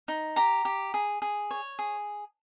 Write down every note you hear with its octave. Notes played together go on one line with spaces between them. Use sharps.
D#4
G4 A#5
G4
G#4
G#4
C#5
G#4